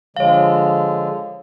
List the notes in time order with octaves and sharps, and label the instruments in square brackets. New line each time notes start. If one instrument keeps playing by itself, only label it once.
[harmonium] D3 F3 G#3 [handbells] C#5 F5